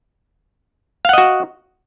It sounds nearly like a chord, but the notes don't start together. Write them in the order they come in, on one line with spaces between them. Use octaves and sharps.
F5 F#5 D#5 F#4